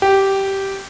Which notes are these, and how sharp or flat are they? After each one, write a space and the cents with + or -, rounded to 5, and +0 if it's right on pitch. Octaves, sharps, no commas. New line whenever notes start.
G4 -10